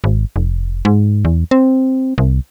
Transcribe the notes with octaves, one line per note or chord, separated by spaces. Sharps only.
G#1
F1
G#2
E2
C4
C2